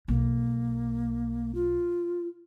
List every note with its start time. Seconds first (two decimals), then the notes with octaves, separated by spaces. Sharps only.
0.08 B1 A#3
1.55 F4